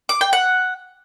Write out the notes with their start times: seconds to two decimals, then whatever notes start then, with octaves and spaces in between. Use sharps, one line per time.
0.09 D6
0.21 G5
0.33 F#5